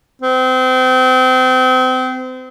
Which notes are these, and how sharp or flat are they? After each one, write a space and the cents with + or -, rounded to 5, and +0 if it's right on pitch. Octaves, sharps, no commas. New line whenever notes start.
C4 -30